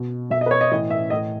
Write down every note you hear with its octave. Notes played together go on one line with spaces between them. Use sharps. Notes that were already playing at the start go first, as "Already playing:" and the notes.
Already playing: B2
B2 E5
D#5
B4
C#5
D#5
A2 E3 D#5
E5
A2 E3 D#5